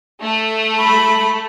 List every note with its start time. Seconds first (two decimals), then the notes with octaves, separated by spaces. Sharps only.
0.23 A3
0.79 B5